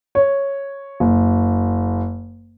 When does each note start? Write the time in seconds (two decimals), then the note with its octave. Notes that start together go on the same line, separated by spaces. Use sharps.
0.15 C#5
1.00 F#1